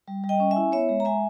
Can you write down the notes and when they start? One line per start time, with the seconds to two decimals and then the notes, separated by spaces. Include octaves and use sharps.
0.08 G3
0.24 G3
0.29 D#5 G5
0.40 C#4
0.51 E5 G#5
0.56 E4
0.72 B3 C#5 E5
0.89 G#3
1.00 A#5
1.05 G#3 E5 G#5